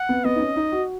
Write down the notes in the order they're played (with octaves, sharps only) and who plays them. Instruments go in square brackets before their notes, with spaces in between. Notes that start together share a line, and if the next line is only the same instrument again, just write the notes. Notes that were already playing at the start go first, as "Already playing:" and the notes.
Already playing: [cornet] F#5
[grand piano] B3
[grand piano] B3 [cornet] D#5
[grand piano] D#4
C#4
D#4
F#4